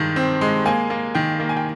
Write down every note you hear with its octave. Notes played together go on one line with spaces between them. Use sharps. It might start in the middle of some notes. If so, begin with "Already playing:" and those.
Already playing: G2 D#3 G#3
C4
G#3
A#3 G#5
A#3
D#3 G5
A#3
G#5
G5